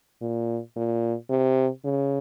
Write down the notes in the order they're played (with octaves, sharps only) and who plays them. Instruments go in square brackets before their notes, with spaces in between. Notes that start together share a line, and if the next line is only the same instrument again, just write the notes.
[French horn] A#2
A#2
C3
C#3